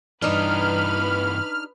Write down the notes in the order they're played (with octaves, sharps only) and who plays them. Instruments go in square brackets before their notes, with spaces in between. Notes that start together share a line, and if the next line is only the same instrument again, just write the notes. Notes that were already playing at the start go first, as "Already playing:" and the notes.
[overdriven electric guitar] G2 E3 [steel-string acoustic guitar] D4 D#4 [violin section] B4 B5 [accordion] F6